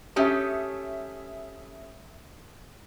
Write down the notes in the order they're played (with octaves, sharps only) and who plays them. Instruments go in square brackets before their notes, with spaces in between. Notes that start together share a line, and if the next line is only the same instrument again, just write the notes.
[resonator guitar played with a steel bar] A3 C#4 G4 [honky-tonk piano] E5 D#6